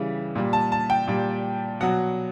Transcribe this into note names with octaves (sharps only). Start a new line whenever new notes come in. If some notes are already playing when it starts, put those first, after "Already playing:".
Already playing: C#3 E3 G3
A#2 G3
A5
A5
G5
A#2 G3
B2 F#3 F#5